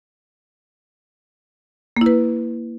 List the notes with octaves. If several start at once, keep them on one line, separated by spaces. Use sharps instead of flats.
A#3 E4 B4